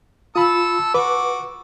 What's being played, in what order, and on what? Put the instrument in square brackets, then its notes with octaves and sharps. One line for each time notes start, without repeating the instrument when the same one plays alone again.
[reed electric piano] F4 B5 [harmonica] A4 E6
[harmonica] F#4 D6 [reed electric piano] B4